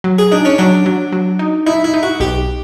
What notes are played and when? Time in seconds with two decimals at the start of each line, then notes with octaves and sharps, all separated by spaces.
0.04 F#3
0.19 G#4
0.31 D4 D#4
0.45 C#4
0.58 F#3 D4
0.86 F#3
1.12 F#3
1.39 D#4
1.66 D#4 E4
1.84 E4
1.94 D#4
2.03 F#4
2.20 B1 G4